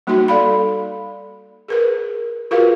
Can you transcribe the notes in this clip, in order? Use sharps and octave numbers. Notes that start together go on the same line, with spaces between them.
G3 A#3 D#4 F#4 C6
A4 D5 F5 B5
G#4 A#4 B4
F4 F#4 G#4 A#4 B4 F5